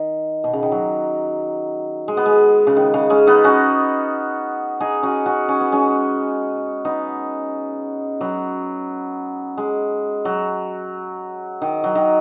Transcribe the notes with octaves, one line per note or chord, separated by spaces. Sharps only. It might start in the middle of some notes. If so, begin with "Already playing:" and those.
Already playing: D#3
B2
C#3
D#3
F#3
G#3
B3
G#3
C#3
D#3
C#3
G#3 C#4
B3 D#4
C#4 F#4
D#4 G#4
C#4 F#4
C#4 F#4
C#4
B3
G#3 C#4
B3 D#4
F#3 B3
G#3
F#3
D#3
F#3
D#3